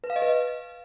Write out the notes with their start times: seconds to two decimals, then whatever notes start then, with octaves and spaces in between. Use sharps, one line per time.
0.04 B4
0.10 F5
0.16 D#5
0.22 B4
0.28 D#5